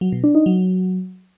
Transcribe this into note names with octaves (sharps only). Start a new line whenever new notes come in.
F#3
B2
D4
D#4
F#3